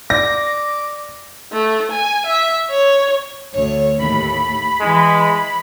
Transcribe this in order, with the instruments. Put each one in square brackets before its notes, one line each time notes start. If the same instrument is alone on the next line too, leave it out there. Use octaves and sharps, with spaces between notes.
[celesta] D5 [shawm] D6 [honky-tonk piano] A#6
[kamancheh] A3
G#5
E5
C#5
[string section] D2 C#5
[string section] D#2 A2 [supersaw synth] B5
[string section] E3 [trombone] G#3